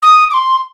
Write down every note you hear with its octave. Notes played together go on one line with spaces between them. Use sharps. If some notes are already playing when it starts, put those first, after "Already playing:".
D#6
D6
C6